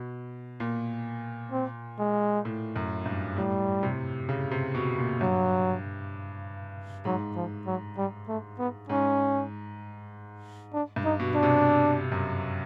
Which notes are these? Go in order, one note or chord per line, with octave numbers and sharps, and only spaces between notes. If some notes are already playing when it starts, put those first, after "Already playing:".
Already playing: B2
A#2
C4
G#3
A2
F#2
G2
A2 G3
C3
C#3
C3
B2
A#2
G2 F#3
G#2 F#3
F3
F#3
G3
A3
B3
G#2 C#4
D4
G2
D#4
B2
D4
C3
F#2